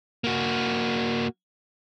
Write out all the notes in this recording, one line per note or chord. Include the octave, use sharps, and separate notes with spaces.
A#3 F#4